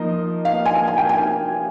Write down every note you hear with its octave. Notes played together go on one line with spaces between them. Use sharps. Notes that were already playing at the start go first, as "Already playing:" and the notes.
Already playing: F3 A#3 D#4 D#5
F5
G#5
G#5
G5
G#5